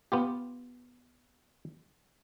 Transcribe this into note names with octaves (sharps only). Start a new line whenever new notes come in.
B3 F4 G4